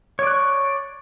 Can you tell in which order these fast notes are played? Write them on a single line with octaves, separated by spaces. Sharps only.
C#5 D5 F#6 C#6